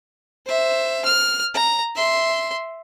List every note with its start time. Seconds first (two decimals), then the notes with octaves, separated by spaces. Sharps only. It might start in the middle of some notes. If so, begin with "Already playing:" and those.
0.46 C5 E5
1.05 F6
1.54 A#5
1.96 E5 C6